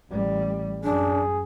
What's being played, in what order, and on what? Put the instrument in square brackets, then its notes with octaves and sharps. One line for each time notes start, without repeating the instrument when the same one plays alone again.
[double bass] A1 G3
[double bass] F#2 [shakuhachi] D4 [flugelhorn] G#4